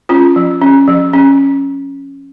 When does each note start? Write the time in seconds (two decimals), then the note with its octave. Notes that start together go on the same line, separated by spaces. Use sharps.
0.09 C#4 F4
0.36 F3
0.61 C#4
0.87 F3
1.13 C#4